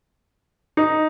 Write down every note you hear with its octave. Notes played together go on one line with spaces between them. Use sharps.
D#4